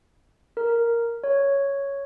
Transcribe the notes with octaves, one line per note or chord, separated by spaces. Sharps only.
A#4
C#5